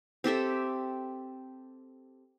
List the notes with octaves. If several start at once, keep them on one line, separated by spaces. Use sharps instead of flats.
C4 G4 A4 E5